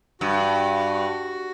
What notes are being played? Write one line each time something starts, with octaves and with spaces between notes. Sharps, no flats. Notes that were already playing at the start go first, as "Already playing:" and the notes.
G2 F#4